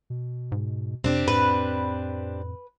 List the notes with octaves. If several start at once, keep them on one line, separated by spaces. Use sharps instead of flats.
B2
G#2
F2 C3 C4 D4 G4
A2 B4